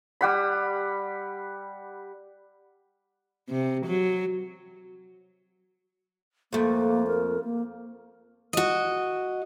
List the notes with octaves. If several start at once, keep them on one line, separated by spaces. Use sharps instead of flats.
G3 F#5 B5
C3
F#3
F2 A3 A#3
A#4
A#3
F#4 D#5